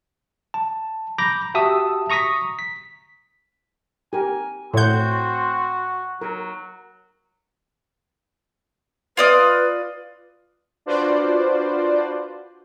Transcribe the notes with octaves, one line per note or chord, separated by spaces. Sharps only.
A5
A#5 B5 D6 G6 A#6
F#4 G4 E5 A5 D#6 E6
A#5 C#6 D#6 A#6 B6
B6
G4 A#4 G#5
A2 C4 F#4 C#5 F#5 G6
F#3 A#4
F4 B4 D5 D#5
D4 F4 F#4 B4 C5 D5